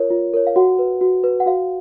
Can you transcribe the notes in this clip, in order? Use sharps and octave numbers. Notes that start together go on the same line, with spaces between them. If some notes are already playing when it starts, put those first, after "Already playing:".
Already playing: F4 A#4 C#5
F4
A#4 C#5
F5
F#4 F#5
B4
F#4
B4
F#5
F#4 F5